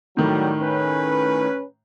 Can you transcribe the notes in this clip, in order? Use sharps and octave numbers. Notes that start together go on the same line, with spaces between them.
A2 D#3 F#3 G3
C#4 B4